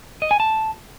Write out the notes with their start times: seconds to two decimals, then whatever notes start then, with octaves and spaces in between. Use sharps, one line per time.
0.22 D#5
0.31 G#5
0.40 A5